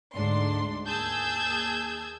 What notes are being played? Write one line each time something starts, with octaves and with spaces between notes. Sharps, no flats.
D2 G#2 D4 C6
D#2 G#4 A5 E6 G6 G#6